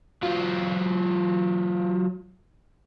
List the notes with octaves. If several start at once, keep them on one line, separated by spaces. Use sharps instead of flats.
F#3 F4